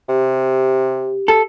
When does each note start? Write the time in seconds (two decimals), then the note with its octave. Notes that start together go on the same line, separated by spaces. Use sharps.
0.09 C3 G4
1.28 A4